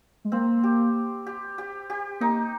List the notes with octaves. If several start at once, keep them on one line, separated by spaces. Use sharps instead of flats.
G#3
A#3 C4
G4
G4
G4
G4
A#3 D#4